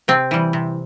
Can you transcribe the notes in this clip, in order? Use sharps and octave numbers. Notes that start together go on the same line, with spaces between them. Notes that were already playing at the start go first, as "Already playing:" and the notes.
C3 C4
E3 G3
C3